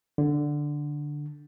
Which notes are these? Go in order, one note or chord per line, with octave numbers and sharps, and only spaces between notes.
D3